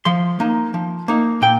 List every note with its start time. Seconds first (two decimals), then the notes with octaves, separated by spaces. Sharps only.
0.05 F3 C6
0.40 A#3 D#4
0.74 F3
1.08 A#3 D#4
1.42 A#2 G5